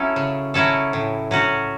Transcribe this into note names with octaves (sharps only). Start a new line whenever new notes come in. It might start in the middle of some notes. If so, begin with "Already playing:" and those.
Already playing: F#3 C#4 E4 A4
C#3
F#3 C#4 E4 A4
A2
F#3 C#4 F#4